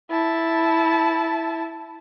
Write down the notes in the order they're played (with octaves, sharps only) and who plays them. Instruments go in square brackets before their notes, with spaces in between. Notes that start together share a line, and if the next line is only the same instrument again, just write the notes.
[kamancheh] E4 A5